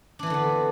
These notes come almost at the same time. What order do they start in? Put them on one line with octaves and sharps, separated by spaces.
D4 E3 C4 D3 B3